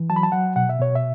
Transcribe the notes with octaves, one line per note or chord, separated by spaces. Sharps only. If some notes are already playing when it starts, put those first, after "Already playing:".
Already playing: E3
F#3 A5
B5
A5
F#3 F#5
B2 F#5
E5
B2 C#5
E5